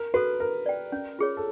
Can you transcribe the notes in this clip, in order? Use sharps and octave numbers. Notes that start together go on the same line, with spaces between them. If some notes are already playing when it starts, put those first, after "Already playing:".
Already playing: A#4
F#4 A4 B4
A#4 B4
D5 G5
C#4
F4 G#4 C#5
A4